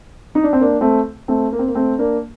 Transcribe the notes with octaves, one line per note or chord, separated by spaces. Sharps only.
D#4
D4
C4
A#3 D4
A3 C4
A3 C4
A#3
C4
A#3
A3 C4
A#3 D4